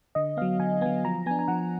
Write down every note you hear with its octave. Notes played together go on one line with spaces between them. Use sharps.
D3 D#5
F#3 B3 F5
D3 G#5
F#3 B3 G#5
F3 A#5
B3 D4 G#5
G#5
F3 F#5